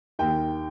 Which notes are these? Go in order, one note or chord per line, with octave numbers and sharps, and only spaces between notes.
D#2 D#3 G5